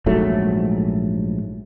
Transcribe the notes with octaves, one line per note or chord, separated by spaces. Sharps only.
A#1 G#2 F#3 A3